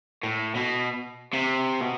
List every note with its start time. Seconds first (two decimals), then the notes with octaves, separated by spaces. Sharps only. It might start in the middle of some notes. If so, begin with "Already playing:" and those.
0.24 A2
0.55 B2
1.33 C3
1.81 B2